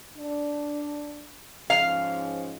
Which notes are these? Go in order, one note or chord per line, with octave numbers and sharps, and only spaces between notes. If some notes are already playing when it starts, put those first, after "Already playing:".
D4
G#2 F3 C#4 F5